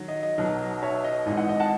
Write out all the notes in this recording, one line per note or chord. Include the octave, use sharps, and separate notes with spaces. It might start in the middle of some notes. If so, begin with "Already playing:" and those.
Already playing: D#3 F#3
D#5
D#5
B1 B2 F#3
C#5 E5
D#5
G#1 G#2 E3 D#5
D#5 F#5
D#5
F#5 A5